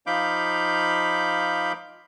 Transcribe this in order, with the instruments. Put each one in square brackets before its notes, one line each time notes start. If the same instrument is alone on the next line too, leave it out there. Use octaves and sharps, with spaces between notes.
[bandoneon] F3 D#4 F5 B5 D6 G6